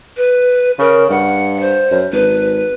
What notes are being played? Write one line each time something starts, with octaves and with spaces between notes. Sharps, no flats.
B4
C#3 A#4
G2 F#5
C5
F#2
G#1 B4